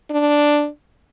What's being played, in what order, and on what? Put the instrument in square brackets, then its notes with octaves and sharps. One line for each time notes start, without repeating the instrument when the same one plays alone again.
[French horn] D4